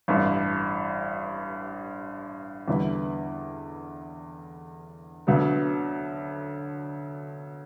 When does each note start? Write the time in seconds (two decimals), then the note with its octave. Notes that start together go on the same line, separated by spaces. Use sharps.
0.08 A1 G2 E3
2.68 E2 D3 G3 B3 E4
5.27 D2 D3 F#3 B3